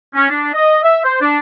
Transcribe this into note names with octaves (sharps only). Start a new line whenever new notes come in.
C#4
D4
D#5
E5
C5
D4